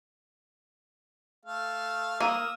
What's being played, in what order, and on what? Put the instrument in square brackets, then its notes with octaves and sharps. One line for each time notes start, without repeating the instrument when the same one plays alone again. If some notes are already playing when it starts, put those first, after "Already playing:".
[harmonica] A3 F5
[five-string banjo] A#3 [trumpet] D#6 [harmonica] E6